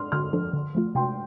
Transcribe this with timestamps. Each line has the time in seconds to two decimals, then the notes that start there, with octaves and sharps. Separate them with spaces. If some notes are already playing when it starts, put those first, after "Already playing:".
Already playing: C6 F6
0.12 D3 C6 F6
0.33 F3 D4 A4
0.53 D3
0.75 F3 A3 F4
0.95 C3 G5 C6